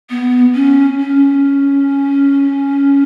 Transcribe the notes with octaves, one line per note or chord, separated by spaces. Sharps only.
B3
C#4
C#4